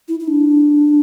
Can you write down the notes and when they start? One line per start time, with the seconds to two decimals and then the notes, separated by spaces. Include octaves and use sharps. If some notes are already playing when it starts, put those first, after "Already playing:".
0.08 E4
0.20 E4
0.28 D4